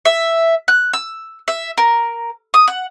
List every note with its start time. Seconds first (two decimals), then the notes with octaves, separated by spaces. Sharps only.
0.05 E5
0.68 F#6
0.93 E6
1.48 E5
1.78 A#4
2.54 D#6
2.68 F#5